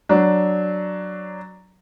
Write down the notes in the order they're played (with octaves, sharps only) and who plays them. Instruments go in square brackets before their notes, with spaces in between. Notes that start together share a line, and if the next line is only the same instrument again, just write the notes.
[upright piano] F#3 D4